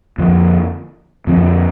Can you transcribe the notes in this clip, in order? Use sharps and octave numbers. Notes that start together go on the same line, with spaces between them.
F2 D3 F3 C4
F2 D3 F3 C4